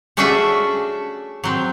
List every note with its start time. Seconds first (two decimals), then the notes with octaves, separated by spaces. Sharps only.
0.17 A3 C#4 D4 F#4 G#4 E5
1.44 F#3 C4